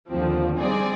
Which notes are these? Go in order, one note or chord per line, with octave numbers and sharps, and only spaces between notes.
D#2 D3 F3 C4
G3 C4 D#4 G#4 D5